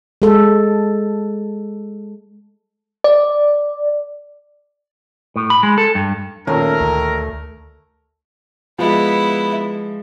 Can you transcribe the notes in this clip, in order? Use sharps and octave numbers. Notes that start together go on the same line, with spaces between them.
G#3 A4
D5
A2
B5
G#3
A4
G2
D#2 A#2 A3 C#4 A#4
D2
F3 G#3 B3 E4